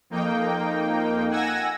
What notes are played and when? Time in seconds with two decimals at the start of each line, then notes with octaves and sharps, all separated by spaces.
0.10 F2 A#3 D#4 G5
1.30 F#5 G#5 E6 G#6 A#6